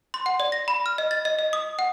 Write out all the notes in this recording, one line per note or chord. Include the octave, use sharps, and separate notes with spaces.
C6
F#5
D5
A#6
B5
F6
D#5
A6
D#5
D#5
D#6
F#5